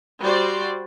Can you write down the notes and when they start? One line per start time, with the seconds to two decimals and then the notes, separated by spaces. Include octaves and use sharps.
0.19 G3 F#4 C5 D5